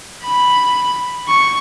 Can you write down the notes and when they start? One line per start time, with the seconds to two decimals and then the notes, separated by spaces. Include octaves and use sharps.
0.24 B5
1.28 C#6